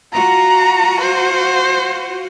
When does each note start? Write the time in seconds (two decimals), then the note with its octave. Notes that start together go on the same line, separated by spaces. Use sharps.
0.13 F4 F#4 A#5
1.01 C5